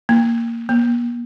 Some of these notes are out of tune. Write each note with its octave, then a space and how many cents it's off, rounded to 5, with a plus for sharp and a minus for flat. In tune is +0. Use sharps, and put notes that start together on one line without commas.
A#3 -5
A#3 +45